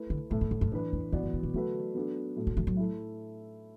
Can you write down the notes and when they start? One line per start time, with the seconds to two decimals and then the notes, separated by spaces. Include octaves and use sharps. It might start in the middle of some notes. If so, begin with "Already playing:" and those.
Already playing: A3 E4 B4
0.10 D3
0.30 F#2 A2 A3 E4
0.41 E2
0.51 F#2
0.61 F#2
0.72 F#2 E3 D4 B4
0.93 E2
1.12 E2 E3 B3 F#4 D5
1.23 F#2
1.33 A2
1.43 B2
1.54 D3 F#3 A3 F#4 B4
1.95 F#3 B3 D4 A4
2.36 A2 F#3 A3
2.47 D3
2.57 E3
2.67 F#3
2.77 A3 E4